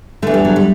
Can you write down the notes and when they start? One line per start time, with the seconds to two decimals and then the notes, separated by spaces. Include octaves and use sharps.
0.22 E2 D3 A3
0.34 G3
0.45 F#3
0.56 G3